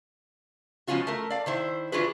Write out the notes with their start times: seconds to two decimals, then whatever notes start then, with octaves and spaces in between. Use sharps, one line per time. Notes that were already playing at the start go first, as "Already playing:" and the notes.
0.87 F3 G#3 B3 C#4 F4 F#4
1.07 A3 A#4
1.30 D5 F5
1.46 D#3 E4 C5
1.92 E3 D4 F4 F#4 G#4 B4